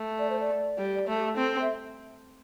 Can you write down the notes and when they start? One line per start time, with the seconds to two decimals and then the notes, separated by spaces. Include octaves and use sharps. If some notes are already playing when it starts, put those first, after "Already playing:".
Already playing: A3
0.19 D5
0.29 C5
0.40 D5
0.78 G3
0.93 D5
1.08 A3 A4
1.19 G4
1.29 A4
1.37 C4
1.61 E5